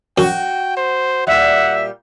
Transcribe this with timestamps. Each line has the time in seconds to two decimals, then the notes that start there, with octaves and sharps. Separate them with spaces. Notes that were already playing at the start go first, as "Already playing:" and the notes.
0.18 F#2 F#4 G5
0.77 C5
1.27 A#2 G3 E5 F#5